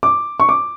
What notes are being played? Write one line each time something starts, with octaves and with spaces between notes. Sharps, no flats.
D6
C#6
D6